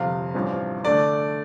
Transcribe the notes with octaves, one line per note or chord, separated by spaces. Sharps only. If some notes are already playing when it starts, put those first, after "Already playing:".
Already playing: G1 F2 C3 F5
A1 G2 F3 C4
D3 A3 D4 D5